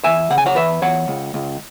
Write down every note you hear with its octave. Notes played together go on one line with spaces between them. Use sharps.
E2 E5 G#5
C#3 F#5
G#5
C#5 F#5
E2 B4 E5
E2 C#5 F#5
C#2
C#2